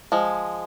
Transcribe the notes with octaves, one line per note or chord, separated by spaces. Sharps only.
F3 G#3